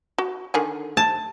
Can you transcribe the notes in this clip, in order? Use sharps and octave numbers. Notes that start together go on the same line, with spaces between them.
F#4
D3 D#3 G#5
A5